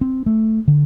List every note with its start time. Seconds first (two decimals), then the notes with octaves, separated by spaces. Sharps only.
0.01 C4
0.26 A3
0.68 D3